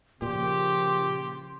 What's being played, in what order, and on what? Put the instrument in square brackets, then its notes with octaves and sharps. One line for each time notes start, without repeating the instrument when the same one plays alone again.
[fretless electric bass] A#2 [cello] C#3 F3 [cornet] G4 [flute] C6